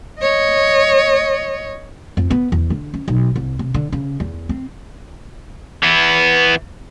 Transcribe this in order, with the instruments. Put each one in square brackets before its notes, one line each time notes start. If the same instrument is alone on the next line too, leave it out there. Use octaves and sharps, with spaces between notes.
[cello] C#5 D#5
[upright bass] F2
B3
E2
D3
C#4
B1
C2
C3
D3
C#3
E2
C4
[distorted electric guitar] E3 B3